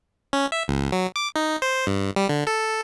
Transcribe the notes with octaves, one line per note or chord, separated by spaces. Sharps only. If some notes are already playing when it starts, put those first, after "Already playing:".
C#4
E5
C#2
F#3
D6
D#4
C5
G2
G3
D3
A4